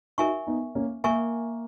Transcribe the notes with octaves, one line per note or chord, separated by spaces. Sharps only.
D#4 F#4 A#4 E5 G#5 C#6
B3 D#4
A#3 C#4
A#3 A#4 E5 G#5 C#6